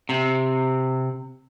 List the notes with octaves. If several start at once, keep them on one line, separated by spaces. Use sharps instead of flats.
C3